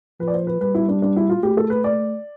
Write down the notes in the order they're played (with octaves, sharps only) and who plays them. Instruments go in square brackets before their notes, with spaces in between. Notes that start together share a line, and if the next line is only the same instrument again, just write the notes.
[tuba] F3 [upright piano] B4
[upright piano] D5
C5
B4
[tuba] G3 [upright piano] B4
[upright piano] E4
D4
D4
E4
F4
[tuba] A3 [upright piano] G4
[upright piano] A4
B4
D5